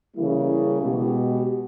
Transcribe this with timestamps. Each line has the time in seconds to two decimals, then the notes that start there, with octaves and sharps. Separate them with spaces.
0.15 C#3 E3 G3 A#3 E4
0.81 B2 G#3 B3 G4